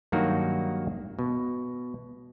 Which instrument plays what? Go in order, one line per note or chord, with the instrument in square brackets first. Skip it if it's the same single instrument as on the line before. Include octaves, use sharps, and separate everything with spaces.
[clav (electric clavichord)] G2 D#3 F#3 A#3 D#4 F#4
B2